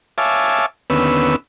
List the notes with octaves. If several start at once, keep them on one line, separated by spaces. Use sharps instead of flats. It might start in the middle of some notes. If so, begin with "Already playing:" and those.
C#5 E5 F5 G#5 A5 D6
D#2 D3 B3 C#4 B4 E6